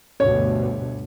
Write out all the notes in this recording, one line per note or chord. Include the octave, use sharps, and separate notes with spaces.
D2 G2 B2 C#5